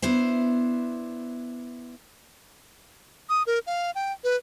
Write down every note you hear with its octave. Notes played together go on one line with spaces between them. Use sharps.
B3 D4 E4 C5
D#6
A#4
F5
G5
B4